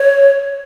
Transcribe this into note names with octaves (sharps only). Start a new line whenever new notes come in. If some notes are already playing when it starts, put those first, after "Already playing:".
Already playing: C#5